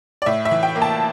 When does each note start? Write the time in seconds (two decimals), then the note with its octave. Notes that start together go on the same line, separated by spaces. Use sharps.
0.22 D5
0.26 A2 E5
0.45 E5
0.51 E3
0.63 G5
0.76 A#3
0.82 A5